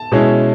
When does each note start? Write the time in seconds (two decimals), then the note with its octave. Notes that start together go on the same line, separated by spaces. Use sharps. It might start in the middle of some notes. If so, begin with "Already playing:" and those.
Already playing: A5
0.12 B2 G#3 C#4 E4